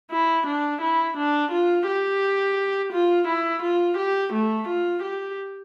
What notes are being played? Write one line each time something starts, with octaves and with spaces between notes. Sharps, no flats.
E4
D4
E4
D4
F4
G4
F4
E4
F4
G4
A3
F4
G4